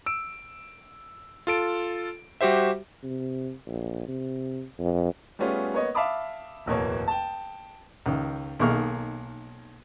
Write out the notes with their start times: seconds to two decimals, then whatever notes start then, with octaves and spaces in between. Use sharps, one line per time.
0.06 E6 D7
1.47 F4 A4 D7
2.41 G3 F#4 G4 C5 E5
3.03 C3
3.66 A#1
4.08 C3
4.79 F2
5.39 G3 A3 B3 C#4 F4 G#4
5.74 A#3 B3 C#5 D#5
5.95 E5 F5 A5 B5 D6 D#6
6.66 D1 E2 B2 A#3 C#5
7.08 G5 A5
8.06 C#2 D#3
8.59 B1 D#3 A#3 G#4 C#6 F6